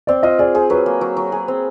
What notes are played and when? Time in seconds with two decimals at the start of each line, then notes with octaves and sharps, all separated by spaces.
0.07 C4 D5
0.23 F4 D#5
0.39 G#4 D5
0.55 G#4 C5
0.70 F#3 B4
0.86 A#3
1.01 F#3
1.17 F#3
1.32 G#4
1.48 C4